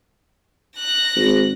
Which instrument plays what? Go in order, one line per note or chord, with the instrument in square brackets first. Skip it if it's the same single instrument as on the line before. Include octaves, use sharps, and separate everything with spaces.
[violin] F#6 A#6
[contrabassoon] G#1